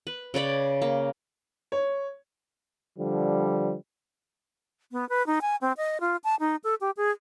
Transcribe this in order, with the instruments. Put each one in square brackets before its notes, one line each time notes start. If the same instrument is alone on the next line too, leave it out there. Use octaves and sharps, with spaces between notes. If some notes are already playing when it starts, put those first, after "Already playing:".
[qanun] B4
C#3 C#5 D5 B5
A#3
[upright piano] C#5
[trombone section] D3 F3 G3
[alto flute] B3
B4
D#4
G#5
C4
D#5
F4
A5
D#4
A4
G4
G#4